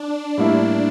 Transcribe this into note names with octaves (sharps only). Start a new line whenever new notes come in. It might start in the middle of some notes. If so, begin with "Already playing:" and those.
Already playing: D4
A2 G3 A#3 E4